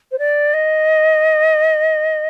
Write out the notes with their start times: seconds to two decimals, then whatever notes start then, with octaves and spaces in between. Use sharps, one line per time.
0.12 C5
0.19 D5
0.54 D#5